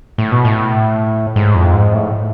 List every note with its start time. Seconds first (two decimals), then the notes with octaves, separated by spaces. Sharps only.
0.18 A2
0.32 B2
0.45 A2
1.36 G#2
1.55 F2
1.74 G#2
1.93 A2